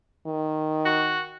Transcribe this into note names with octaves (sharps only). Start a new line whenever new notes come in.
D#3
F#4